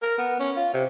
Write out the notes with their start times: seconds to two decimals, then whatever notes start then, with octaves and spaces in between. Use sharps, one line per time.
0.02 A#4
0.18 B3
0.39 C#4
0.56 F4
0.74 C3